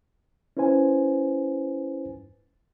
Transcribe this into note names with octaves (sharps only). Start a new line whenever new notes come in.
C#4 E4 B4 C5 G#5